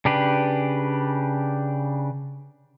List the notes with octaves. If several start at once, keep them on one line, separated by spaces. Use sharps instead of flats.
C#3 D4 G4 B4